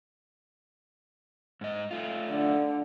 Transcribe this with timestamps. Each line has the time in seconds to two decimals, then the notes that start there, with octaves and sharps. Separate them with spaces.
1.61 G#2 D#5
1.91 A3 F4
2.30 D3